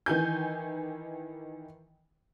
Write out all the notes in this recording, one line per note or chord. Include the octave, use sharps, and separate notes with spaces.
D#3 E3 G#5 G6